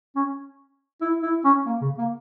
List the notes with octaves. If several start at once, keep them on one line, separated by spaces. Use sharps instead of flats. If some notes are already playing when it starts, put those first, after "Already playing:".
C#4
E4
E4
C#4
A#3
C#3
A#3